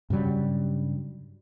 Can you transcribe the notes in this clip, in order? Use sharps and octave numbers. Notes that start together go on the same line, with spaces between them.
G2 C#3 F#3 G3